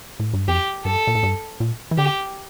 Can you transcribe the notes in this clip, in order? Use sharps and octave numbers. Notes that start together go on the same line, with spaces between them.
A2
G2
F2 G4
G2 A4
A#2
A2
G2
A#2
E3
D3 G4